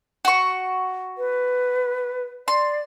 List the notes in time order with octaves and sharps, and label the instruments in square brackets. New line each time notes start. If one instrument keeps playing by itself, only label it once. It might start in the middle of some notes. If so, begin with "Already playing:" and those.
[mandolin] F#4 C#6
[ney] B4
[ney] D5 [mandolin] C6